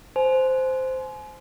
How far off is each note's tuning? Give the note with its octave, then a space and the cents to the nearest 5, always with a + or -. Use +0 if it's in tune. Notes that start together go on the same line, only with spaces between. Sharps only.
C5 -10 G#5 +35